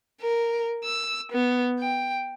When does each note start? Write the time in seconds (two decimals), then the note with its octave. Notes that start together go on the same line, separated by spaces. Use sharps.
0.21 A#4
0.85 E6
1.32 B3
1.80 G5